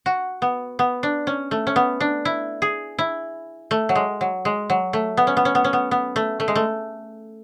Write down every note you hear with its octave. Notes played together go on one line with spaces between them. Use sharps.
F#4
B3
B3
D4
C#4
A3
C#4
B3
D4
E4
G#4
E4
A3
F#3
G#3
F#3
G#3
F#3
A3
B3
C#4
B3
C#4
B3
C#4
B3
B3
A3
A3
G#3
A3